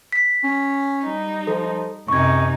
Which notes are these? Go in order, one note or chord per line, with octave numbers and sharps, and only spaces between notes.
B6
C#4
G3 D#4
F3 A4
F#2 C3 D#4 C#6 G#6